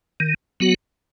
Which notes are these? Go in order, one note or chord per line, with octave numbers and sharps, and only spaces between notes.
D#3
F#3 B3 F#4